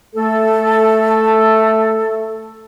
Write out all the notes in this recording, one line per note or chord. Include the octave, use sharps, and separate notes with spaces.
A3 A4